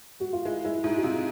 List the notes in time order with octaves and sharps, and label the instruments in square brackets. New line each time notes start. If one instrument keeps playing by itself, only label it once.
[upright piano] F#4
F4
[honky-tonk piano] G#3 [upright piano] E4
[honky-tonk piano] G#3 [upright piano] E4
[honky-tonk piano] G#2 [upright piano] E4
[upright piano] F#4
[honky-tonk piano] C3 [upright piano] F4